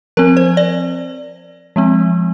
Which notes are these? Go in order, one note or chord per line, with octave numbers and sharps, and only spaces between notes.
F3 C4 A#4
C5
D5
F3 G#3 C4